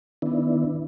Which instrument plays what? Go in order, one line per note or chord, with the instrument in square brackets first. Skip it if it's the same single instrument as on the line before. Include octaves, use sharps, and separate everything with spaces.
[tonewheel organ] D#3 B3 D4 E4